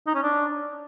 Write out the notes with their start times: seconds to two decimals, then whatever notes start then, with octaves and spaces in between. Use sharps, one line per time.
0.07 D#4
0.15 C#4
0.23 D4